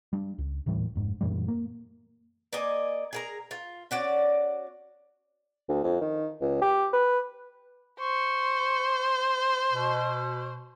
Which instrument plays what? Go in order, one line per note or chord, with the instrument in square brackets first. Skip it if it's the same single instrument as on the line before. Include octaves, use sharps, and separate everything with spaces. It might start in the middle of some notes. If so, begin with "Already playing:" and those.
[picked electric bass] G3 D4
C#2
D#1 A2 E3 G3
F1 G#2
F#2 A#2 E3 G3
A#3
[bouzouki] A#3 D5 D#5 G#5
G#4 A#4 A#5
F4
C#4 F#4 D5
[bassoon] D2
F2
D#3
C#2
G4
B4
[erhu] C5 [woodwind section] C#6
[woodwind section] B2